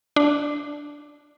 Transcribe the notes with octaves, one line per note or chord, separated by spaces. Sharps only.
D4